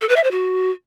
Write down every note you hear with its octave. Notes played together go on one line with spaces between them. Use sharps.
A4
B4
E5
C5
F#4